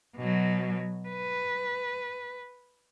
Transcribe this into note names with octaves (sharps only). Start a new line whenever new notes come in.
B2 F#3
B4